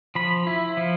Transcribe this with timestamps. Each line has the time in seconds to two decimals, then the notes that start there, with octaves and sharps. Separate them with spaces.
0.15 F3 B5
0.47 E4
0.77 F3